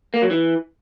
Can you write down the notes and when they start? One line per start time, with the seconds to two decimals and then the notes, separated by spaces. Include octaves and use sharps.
0.14 A#3
0.22 F#3
0.31 E3